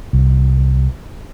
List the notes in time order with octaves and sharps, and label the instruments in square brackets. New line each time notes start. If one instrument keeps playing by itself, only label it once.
[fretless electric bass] C2